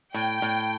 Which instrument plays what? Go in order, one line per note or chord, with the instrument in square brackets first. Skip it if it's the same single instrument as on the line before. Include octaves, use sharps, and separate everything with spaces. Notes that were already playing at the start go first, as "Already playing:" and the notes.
[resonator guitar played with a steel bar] A2 [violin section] G5
[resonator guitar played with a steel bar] A2